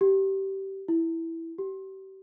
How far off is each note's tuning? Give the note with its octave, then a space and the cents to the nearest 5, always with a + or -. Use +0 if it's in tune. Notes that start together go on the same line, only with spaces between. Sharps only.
G4 -20
E4 +0
G4 -35